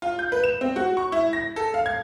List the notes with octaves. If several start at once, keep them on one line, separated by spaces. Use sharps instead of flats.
F4
G6
B4
E7
C4
F#4
C#6
E4
A#6
A4
F5
G#6